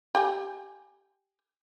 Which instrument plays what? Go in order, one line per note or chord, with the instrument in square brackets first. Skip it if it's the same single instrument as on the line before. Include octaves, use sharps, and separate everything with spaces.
[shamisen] G4 G5 G#5